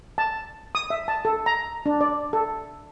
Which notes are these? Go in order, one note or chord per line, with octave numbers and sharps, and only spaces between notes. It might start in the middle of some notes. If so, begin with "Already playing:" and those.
A5
D#6
E5
A5
A4
A#5
D4
D5
A4